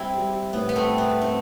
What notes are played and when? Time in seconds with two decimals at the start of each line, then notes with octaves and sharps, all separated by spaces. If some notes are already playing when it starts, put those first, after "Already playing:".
Already playing: G3 C4 E4
0.18 G3
0.53 A2 B3
0.69 B3
0.76 A3 C4
0.88 A2
0.98 B3
1.21 A3 C4